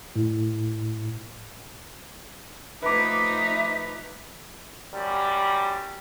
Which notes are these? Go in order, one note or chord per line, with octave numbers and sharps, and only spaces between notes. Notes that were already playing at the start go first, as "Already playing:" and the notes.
A2
F3 A3 D#4 B4 E5 D6
F#2 G3